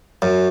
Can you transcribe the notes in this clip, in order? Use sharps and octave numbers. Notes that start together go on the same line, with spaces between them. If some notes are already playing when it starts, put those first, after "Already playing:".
F#2